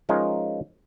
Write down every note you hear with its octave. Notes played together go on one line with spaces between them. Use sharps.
F3 G#3 C#4 D#4 F4 A#4